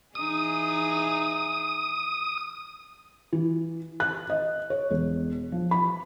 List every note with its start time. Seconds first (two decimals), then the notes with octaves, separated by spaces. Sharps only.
0.15 E3 D#4 G#4 D#6
3.33 E3
4.00 F#6
4.30 D#5
4.70 C#5
4.91 E1
5.52 F3
5.71 B5